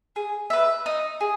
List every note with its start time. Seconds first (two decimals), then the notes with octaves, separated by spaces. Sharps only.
0.16 G#4
0.50 B4 E5
0.86 D#4
1.21 G#4